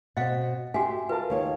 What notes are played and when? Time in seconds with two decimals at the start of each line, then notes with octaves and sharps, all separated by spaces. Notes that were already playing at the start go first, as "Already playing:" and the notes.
0.17 B2 C4 D#5 F5 F#5
0.74 C#4 F#4 G4 E5 G#5
1.09 F4 A#4 B4 A5
1.30 D#2 C#5